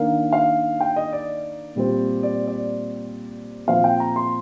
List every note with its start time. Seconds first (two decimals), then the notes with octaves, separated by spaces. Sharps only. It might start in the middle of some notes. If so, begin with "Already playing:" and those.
Already playing: D#3 A#3 D4 F5
0.33 F5
0.80 G5
0.96 D#5
1.12 D5
1.76 A#2 G3 C4
2.23 D5
2.47 D5
3.67 A#2 F3 C4 F5
3.84 G5
4.00 A#5
4.16 C6